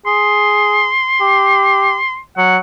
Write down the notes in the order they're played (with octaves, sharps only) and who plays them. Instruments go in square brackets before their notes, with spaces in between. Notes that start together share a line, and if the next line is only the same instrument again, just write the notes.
[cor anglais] G#4 [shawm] C6
[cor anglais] G4
[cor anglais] F#3 [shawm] F#5